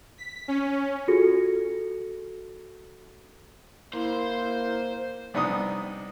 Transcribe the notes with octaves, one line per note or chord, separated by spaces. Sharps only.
B6
C#4
F4 F#4 G#4 A4 A#6 C#7
A#3 E4 C5
C2 B3 D4 D#4 D#5 D#6